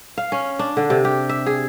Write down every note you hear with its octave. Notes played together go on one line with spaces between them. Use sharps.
F5
C#4
D4
D3
C3
G4
E5
G#4